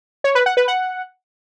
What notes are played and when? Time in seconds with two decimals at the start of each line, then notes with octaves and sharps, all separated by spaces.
0.24 C#5
0.35 B4
0.46 F#5
0.57 B4
0.68 F#5